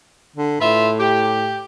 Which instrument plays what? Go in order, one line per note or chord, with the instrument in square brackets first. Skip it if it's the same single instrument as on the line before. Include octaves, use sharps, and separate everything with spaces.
[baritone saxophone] D3
[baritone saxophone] A2 [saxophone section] F4 B4 E5
[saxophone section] G4